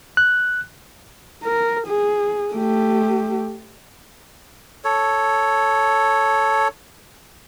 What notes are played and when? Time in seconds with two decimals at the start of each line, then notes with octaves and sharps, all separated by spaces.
0.17 F#6
1.44 A#4
1.87 G#4
2.54 A3 G4
4.84 A4 C#5